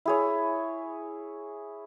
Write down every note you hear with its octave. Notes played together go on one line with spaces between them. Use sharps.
E4 G#4 C#5